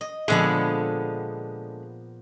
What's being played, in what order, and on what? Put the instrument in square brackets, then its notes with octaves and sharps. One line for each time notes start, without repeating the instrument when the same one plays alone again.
[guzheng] D#5
[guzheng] A#2 F3 B3 [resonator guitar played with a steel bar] D3 G#3